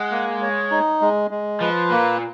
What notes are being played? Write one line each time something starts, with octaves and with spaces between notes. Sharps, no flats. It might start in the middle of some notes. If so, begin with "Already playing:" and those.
Already playing: G#3 F#5
A#3
C#5
D#4
G#3
G#3
F3 B4
A#2 A#3